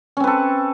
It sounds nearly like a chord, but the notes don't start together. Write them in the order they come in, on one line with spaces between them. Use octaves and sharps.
C#4 C4 B4 A4